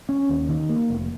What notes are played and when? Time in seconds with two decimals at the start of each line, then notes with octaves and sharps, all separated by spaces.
0.09 C#4
0.29 D#2
0.49 D#3
0.69 A#3
0.90 F1